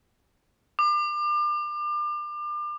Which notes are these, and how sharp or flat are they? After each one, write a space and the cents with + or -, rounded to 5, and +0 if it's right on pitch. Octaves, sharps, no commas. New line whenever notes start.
D6 +35